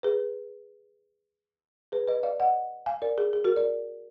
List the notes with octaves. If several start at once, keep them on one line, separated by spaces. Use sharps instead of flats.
G#4 B4
G#4 B4
B4 D#5
D5 F5
D#5 F#5
F5 G#5
A#4 D5
G#4
G#4
F#4 A#4
A#4 D5